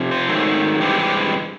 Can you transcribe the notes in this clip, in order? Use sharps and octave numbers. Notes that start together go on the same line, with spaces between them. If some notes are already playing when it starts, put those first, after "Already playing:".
Already playing: F2 C3 F3
C5
G#2 D#3 F#3 A3 C4
G2 E3 G#3 C4 G4
G4